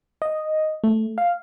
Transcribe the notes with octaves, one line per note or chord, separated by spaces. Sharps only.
D#5
A3
F5